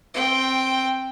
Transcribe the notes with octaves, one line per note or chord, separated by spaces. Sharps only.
C4 G5